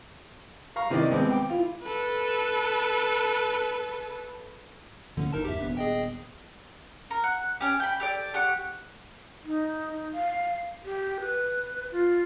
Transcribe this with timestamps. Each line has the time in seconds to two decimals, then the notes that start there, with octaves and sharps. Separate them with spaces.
0.76 F5 A#5 C#6
0.90 C3 D#3 E3 D5 D#5 D6
1.10 D#2 G#3 B3 C4 D6
1.31 G5 D6
1.50 E4 F4
1.84 A4 B4
5.17 D3 E3 A3 C#4
5.33 F#1 D#4 A#4 A5
5.45 E2 G#2 G4 E5
5.60 D#1 B3 D4
5.77 G#4 D#5 G5
7.11 A#4
7.24 F#5
7.61 C#4 G4
7.80 G5 B5
8.00 G4 A4 D5
8.34 G4 F#5 C#6
9.44 D#4
10.14 F5
10.85 G4
11.20 B4
11.92 F4